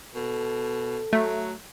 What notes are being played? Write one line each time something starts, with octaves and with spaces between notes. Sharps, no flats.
B2 A4
F#3 A3